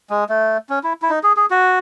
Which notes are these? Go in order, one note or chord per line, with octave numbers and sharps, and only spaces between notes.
G#3
A3
C#4
E4
E4
D#4
G#4
G#4
F#4